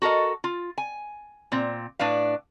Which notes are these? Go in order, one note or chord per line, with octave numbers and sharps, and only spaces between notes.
F#4 A4 A#4 D#5
F4
G#5
A#2 C4
A2 D4 B4 F5